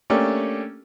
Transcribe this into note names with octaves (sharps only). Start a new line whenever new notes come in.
A3 A#3 C#4 D4 G4